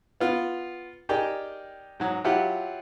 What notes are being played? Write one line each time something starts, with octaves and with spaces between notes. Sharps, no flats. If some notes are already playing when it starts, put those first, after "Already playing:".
B3 F4
D#4 G4 G#4 A#4 D5 G5
G#2 F#3
F#3 E4 F4 G4 F#5